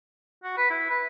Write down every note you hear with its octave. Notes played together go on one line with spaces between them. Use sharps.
F#4
B4
E4
B4